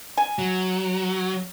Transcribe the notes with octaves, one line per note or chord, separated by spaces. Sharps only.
G#5
F#3